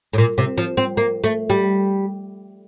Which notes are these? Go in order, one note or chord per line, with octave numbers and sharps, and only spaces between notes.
A2
A#2
C3
F3
C4
A#3
A3
G3